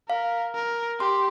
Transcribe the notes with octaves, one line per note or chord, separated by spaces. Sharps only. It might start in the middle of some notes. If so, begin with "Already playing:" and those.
A#4 F5
A#4
G4 C6